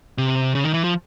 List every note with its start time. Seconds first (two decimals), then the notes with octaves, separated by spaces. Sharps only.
0.18 C3
0.55 C#3
0.64 D#3
0.74 E3
0.84 F3